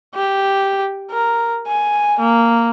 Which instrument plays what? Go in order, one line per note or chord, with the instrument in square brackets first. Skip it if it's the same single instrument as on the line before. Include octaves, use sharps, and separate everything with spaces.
[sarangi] G4
A#4
G#5
A#3